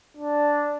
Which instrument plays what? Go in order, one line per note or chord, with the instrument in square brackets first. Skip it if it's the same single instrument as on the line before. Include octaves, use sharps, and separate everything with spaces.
[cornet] D4